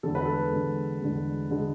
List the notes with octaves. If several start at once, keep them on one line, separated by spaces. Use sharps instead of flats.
E2 D3 G#3 A4
B4
A4
E2 D3 G#3
E2 D3 G#3
D3 G#3